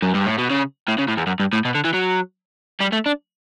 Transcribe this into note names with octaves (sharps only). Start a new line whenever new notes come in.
F#2
G2
A2
B2
C#3
A2
C#3
A2
E2
F#2
G2
A2
B2
D3
E3
F#3
G3
A3
D4